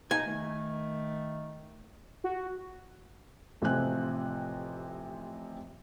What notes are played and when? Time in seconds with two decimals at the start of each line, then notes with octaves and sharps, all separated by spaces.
0.11 D#4 G#5
0.26 D#3 A3
2.24 F#4
3.62 A1 C3 F3 C4 G#5 F#6